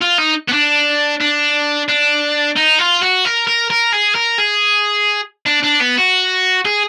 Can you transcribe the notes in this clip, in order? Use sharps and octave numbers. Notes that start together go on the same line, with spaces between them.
F4
D#4
B3
D4
D4
D4
D#4
F4
F#4
A#4
A#4
A#4
G#4
A#4
G#4
D4
D4
B3
F#4
G#4